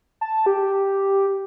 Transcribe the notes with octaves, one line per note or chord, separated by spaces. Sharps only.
A5
G4